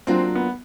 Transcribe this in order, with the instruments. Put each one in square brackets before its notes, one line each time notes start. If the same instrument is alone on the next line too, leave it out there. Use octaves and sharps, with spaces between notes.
[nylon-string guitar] F#3 A#3 D4 F4 [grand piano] C4
[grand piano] B3